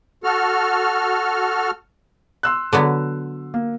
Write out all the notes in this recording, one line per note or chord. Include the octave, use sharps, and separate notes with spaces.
F#4 A4 F6
C6 E6 F#6
D3 F#3 B3
A#3